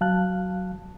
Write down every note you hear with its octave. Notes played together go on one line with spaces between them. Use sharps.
F#3 F5 A5 F#6